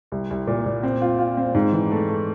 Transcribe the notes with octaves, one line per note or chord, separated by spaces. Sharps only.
C2
C2
A#2
A#2
C4
F4
F4
C4
G#2
E3
A3
A3